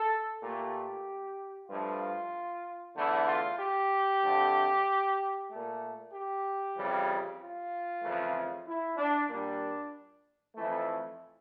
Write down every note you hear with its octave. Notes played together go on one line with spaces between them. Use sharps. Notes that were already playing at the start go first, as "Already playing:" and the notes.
Already playing: A4
A#2 A3 G4
G2 F3 A3 F4
E2 D3 A3 E4
F4
G4
F2 D3 F3 A3
A#2 A3
G4
F2 C#3 E3 G3
F4
F2 C#3 E3 A3
E4
D4
A#2 G3 D4
F2 E3 A3